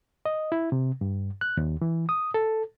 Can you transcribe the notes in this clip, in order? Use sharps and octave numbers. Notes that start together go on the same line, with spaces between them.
D#5
E4
C3
G2
F#6
D#2
E3
D#6
A4